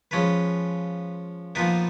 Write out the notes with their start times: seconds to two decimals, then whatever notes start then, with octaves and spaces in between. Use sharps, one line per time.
0.11 F3 G#3 C#4 B4
1.55 A#2 F3 B3 D#4 B4